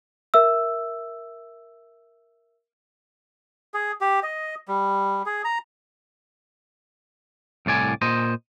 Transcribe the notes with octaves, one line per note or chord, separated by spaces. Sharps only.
A#4 E5 E6
G#4
G4
D#5
G3
G#4
A#5
C2 A2 D5 G#5
A#2 C5 D#5